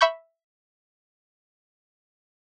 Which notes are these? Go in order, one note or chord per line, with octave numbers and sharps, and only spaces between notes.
E5 B5 C#6 G6